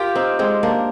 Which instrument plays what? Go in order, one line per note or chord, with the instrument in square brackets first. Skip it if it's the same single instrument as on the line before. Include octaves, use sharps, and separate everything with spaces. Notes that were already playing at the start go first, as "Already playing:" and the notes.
Already playing: [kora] F4 [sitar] G4 A#4
[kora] C4 D#4
G#3 C4
A#3 D4